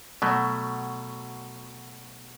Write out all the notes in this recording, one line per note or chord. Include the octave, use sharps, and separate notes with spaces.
B2 F#3 A3